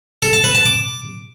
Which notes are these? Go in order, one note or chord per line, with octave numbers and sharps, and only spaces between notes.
A4
A5
B4
A5
D6